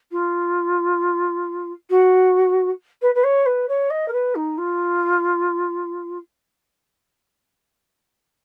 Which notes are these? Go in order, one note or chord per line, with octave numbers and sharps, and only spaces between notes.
F4
F#4
B4
B4
C#5
B4
C#5
D#5
A#4
B4
D#4
F4